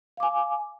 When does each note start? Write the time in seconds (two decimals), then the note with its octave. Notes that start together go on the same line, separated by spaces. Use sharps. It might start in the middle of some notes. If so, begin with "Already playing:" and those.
0.17 F5
0.20 D6
0.23 G#5